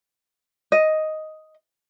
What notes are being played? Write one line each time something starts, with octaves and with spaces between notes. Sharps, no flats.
D#5